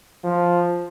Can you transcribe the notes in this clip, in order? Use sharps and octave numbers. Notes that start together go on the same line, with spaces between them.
F3